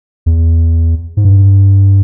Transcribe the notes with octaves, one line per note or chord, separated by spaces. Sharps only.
E2
G#2
G2